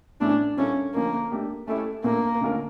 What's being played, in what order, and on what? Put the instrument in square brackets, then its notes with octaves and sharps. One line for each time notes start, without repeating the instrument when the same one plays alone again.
[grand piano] A2 E3 A3 C#4 E4 [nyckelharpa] D4
[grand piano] A#2 G3 A#3 E4 A4 [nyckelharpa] C#4
[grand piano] D3 F3 A3 C#4 [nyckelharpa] A#3
[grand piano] A3 D4 G4
[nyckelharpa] A3 [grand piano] C#4 E4 G4
[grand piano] A#2 A3 D4 F4 [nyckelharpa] A#3
[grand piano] D3 A3 C#4 F4 A#4